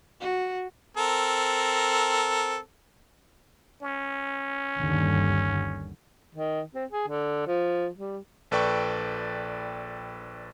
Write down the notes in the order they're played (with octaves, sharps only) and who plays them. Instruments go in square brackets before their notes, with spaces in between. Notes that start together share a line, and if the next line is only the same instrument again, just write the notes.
[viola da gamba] F#4
[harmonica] C4 A4 A#4
[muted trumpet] C#4
[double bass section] G1 D#2 D3
[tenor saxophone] D#3
C4
G#4
D3
F3
G3
[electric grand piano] A#1 A4 B4 D5 G5 C#6